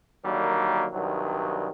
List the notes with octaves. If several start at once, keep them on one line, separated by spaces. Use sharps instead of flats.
D3 D#3 F#3 G3 A#3
C2 G2 D#3 F#3